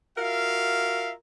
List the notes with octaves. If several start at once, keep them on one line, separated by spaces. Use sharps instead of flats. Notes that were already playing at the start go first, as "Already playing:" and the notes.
F4 F#4 A#4 E5 F5